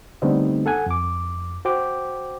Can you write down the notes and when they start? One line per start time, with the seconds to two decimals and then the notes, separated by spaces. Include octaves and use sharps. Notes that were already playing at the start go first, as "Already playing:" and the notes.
0.22 D3 G3 A3 B3 C4 D#4
0.66 A4 F#5 G#5
0.86 F2 D6
1.65 F#4 C5 G5 D6